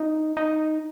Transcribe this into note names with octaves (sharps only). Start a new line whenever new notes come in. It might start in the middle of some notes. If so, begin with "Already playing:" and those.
Already playing: D#4
D#4